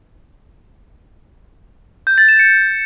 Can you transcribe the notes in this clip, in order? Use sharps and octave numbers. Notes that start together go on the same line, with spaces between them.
G6
A6
E7
C#7